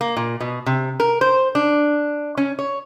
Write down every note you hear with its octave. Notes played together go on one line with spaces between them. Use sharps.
A#3
A#2
B2
C3
A#4
C5
D4
C#4
C#5